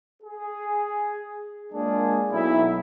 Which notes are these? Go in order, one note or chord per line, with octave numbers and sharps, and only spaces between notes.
G#4
G#3 A#3 D4 F4 G#4
B1 E4